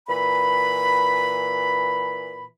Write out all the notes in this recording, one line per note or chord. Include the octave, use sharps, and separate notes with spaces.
A#2 E3 B5